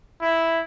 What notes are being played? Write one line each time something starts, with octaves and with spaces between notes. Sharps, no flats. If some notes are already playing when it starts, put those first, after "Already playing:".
E4